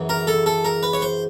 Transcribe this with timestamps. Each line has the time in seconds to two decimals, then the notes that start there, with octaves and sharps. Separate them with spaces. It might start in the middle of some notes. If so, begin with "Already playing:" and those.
Already playing: F#2 C#3 E3
0.09 A#4
0.27 A4
0.46 A4
0.65 A#4
0.83 B4
0.93 C#5
1.02 C5